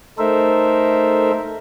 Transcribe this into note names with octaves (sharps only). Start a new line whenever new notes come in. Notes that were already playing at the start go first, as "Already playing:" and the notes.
A3 D#4 A4 A#4 C5 E5